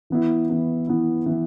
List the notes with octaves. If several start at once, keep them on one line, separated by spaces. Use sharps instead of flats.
E3 B3 E4
E3 B3 E4
E3 B3 E4
E3 B3 E4